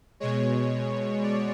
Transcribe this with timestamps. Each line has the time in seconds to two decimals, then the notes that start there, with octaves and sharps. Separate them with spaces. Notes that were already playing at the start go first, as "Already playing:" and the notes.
0.20 B2 G#3 C#5
1.23 D5